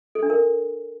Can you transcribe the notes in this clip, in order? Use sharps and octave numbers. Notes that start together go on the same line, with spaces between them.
A4
D4
A#4